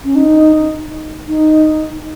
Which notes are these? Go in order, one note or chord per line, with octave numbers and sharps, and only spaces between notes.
C#4
D#4
D#4